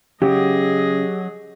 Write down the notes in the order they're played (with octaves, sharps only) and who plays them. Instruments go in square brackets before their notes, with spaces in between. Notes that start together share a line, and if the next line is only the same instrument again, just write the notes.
[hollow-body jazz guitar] C#3 [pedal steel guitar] F#3 [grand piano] G4 [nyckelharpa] G#4 D#5